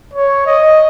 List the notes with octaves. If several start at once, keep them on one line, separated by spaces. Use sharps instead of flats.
C#5
D#5